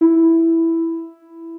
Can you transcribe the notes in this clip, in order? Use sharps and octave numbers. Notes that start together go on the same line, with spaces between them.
E4